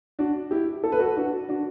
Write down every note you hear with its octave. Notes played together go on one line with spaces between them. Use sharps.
D4 F#4
E4 G4
A4
B4
F#4 A4
D4 F#4
D4 F#4